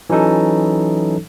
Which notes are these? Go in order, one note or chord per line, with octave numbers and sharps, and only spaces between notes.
E3 F#3 C#4 D#4 A4